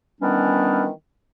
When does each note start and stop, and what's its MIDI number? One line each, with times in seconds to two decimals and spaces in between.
0.21 0.88 51
0.21 0.88 52
0.21 0.88 55
0.21 0.88 59
0.21 0.88 61
0.21 0.88 62